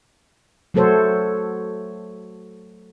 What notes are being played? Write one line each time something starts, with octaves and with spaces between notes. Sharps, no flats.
F#3 A3 F#4 A4 C5 C#5